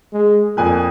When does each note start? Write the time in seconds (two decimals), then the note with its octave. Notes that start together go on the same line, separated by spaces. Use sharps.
0.13 G#3
0.57 F2 A#2 G#5 F#6